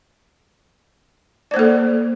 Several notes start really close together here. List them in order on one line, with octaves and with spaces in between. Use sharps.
D5 C5 A#3 A4